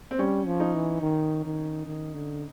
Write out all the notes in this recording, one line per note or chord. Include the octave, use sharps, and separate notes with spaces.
C4
G3 C#4
F3
D#4
E3
D#3
D#3
D#3
D3